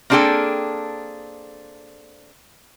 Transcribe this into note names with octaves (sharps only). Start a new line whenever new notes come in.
A#3 C4 D4 G#4 A4 G5